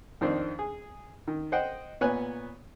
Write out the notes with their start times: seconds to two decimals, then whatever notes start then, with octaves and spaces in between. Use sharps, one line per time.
0.21 F2 D#3 C4 D4
0.59 G#4
1.28 D#3
1.52 C5 D#5 F#5 G5
2.01 A#2 B3 C#5 G#5 F#6